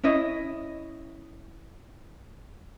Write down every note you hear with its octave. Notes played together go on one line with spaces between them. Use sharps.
C#4 E4 D#5